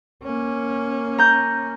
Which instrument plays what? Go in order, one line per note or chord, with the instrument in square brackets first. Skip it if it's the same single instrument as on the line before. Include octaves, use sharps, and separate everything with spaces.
[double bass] A#3 C#4
[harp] A#5 G6